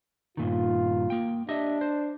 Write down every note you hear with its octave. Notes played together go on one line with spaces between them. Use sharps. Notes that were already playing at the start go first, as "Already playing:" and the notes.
G2 A#2 D#3 F4
A#3 G5
D4 G4 D#5 E5
C5